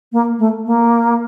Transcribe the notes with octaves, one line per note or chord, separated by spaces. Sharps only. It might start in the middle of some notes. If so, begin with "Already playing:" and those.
A#3
A3
A#3